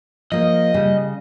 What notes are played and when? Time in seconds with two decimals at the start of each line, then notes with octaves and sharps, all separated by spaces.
0.32 F3 A#3 D#5
0.74 C#3 G3